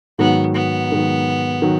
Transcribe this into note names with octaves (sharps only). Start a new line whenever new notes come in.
G#2 D#3 F#3 B3
B3
G#2 D#3 F#3
D#3 F#3